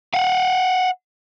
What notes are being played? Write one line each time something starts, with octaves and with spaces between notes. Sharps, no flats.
F5 F#5